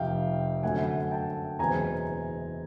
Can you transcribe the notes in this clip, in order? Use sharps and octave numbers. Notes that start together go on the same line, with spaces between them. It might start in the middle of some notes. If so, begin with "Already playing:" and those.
Already playing: F1 F2 C3 F5 G5
F#2 D3 F#3 A3 C4 F#5 G#5
G5 A5
F#1 E2 B2 G#3 C4 G#5 A#5